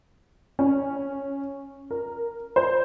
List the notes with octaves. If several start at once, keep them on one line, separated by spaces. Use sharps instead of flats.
C#4
A#4
C5